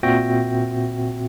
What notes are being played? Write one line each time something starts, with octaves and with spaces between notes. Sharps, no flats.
A#2 C4 F#4 E5 G5 A#6